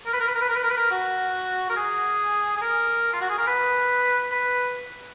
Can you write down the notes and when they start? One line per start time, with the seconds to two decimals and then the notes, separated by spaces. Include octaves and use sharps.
0.06 A#4
0.14 B4
0.21 A#4
0.28 B4
0.35 A#4
0.42 B4
0.49 A#4
0.56 B4
0.64 A#4
0.71 B4
0.77 A#4
0.91 F#4
1.70 A#4
1.76 G#4
2.57 G#4
2.62 A#4
3.13 F4
3.21 F#4
3.30 G#4
3.38 A#4
3.47 B4
4.32 B4